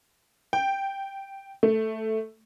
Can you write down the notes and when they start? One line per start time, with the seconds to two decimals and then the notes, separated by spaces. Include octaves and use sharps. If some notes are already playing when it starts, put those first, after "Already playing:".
0.53 G5
1.63 A3